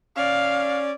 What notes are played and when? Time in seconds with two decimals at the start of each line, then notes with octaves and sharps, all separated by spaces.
0.16 C#4 D5 F5